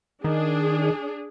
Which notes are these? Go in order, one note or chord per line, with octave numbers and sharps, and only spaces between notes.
D#3 D4 G#4